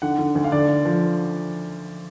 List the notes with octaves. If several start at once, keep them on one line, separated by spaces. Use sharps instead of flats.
D3 F#5
D3
D2
F5
D3 D5
D3
F3